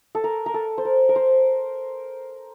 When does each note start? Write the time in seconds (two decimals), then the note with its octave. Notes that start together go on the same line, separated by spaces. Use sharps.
0.15 A4
0.24 A#4
0.46 A#4
0.54 A4
0.78 C5
0.85 A#4
1.09 A#4
1.16 C5